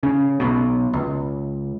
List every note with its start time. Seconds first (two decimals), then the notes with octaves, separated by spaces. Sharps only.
0.03 C#3
0.40 B1 B2
0.93 C#2